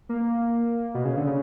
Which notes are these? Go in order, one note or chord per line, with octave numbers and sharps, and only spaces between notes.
A#3
B2
C#3
D3
C#3